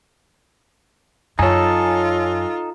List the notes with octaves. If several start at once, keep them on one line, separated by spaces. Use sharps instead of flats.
F#2 D#4 F4 A4 C#5 G#5